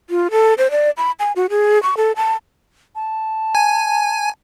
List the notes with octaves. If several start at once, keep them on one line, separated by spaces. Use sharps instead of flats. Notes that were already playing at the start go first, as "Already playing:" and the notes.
F4
A4
C5
D5
B5
G#5
F#4
G#4
C#6
A4
A5
A5
G#5